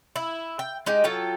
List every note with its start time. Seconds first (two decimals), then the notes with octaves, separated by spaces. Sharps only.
0.16 E4
0.59 G5
0.86 G#3 D#4 G4
1.04 F#3 F4 A4 G5